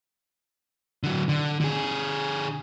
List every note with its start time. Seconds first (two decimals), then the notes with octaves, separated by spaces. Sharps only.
1.03 D3 F#3
1.29 D3
1.60 D3 G#4